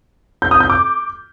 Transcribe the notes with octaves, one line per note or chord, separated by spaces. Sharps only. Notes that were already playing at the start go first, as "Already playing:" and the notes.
G6
D#6
G6
D6